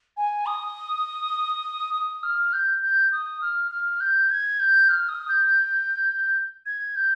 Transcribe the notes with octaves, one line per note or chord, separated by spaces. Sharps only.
G#5
D#6
D#6
F6
G6
G6
D#6
F6
F6
G6
G#6
G6
F6
D#6
G6
G#6
G6